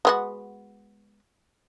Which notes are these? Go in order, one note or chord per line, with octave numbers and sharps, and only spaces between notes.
G#3 B3 F#4